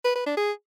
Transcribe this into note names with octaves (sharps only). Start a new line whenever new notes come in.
B4
B4
D4
G#4